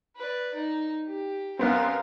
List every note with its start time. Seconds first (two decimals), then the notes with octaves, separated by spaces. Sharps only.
0.16 B4 D5
0.54 D#4
1.07 G4
1.59 F#2 B3 C4 A#4 F5